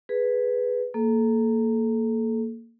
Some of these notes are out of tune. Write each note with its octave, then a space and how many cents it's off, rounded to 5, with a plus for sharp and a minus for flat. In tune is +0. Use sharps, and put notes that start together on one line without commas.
G#4 +0 B4 +0
A#3 -15 A4 -30